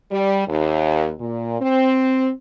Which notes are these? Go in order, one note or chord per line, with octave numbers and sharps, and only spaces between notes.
G3
D#2
A#2
C4